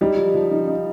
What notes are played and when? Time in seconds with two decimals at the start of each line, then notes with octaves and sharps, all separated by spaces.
0.01 G3 D#4
0.17 F3
0.34 F3
0.51 D#4
0.67 D#4